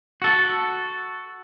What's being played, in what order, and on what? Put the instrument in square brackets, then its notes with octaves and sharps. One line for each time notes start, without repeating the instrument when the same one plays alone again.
[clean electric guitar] F#4 A4